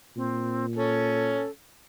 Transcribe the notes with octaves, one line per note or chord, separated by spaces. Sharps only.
A#2 C4
C#4 A4